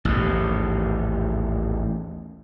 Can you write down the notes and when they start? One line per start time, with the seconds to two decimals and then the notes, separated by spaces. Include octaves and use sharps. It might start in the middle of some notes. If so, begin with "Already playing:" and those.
0.05 A1 D#2 G#2